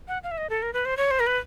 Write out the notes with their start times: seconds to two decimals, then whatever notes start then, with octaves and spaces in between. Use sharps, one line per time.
0.08 F#5
0.23 F5
0.31 E5
0.38 D#5
0.50 A4
0.62 A#4
0.73 B4
0.85 C5
0.97 C#5
1.11 C5
1.20 A#4
1.27 B4